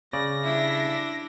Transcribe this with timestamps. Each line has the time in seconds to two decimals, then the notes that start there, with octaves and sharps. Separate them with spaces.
0.13 C#3 D5 A#6
0.43 G3 D4 E4 E5